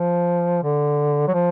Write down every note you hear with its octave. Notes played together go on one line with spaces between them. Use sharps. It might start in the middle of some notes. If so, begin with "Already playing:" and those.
Already playing: F3
D3
F#3
F3